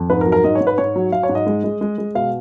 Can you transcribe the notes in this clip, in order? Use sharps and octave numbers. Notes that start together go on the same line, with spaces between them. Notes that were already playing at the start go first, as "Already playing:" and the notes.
Already playing: F2
G#2 B4
A#4
F#3
A#4
G#2 D#5
C#5
G#2
B4
G#2 C#5
F#3
F#3 F5
C#5
G#2
D#5
G#3
G#3
G#3
G#3
B2 F5